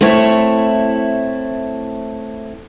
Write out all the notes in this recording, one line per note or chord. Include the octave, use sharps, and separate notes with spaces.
A3 C4 E4 C#5